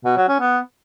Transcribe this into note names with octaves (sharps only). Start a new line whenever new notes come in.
B2
F#3
C#4
B3